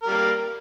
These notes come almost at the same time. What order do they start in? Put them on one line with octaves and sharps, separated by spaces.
A#4 G3 A#3